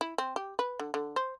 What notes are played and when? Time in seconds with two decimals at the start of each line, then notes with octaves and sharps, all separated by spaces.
0.01 E4
0.18 C4
0.36 G4
0.59 B4
0.79 D3
0.94 D3
1.16 C5